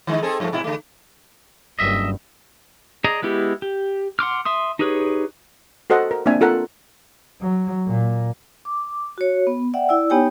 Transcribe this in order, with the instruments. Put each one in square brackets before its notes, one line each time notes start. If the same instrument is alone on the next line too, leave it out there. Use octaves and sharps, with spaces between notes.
[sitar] D#3 G#3 D#4
C4 G#4 A4
G2 F3 A3
G#2 B2 E4
D3 A3
[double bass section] F#1 G2 [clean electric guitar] D#5 E5
[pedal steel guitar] G#4 D5 D#5 A#5
G#3 B3 E4 G4
G4
F#5 C6 D6 F6
E5 C6 D#6
D#4 G4 G#4 B4 C#5
[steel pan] F#4 A4 C5 D#5 F#5
A#4
A#3 C4 D4 E5 G#5
F4 A4 A#4 F#5
[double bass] F#3
A#2
[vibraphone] D6
F#4 C#5
B3
D5 E5 F#5 G5
E4 D5 E6
B3 D#4 G4 C#5 G5 G#5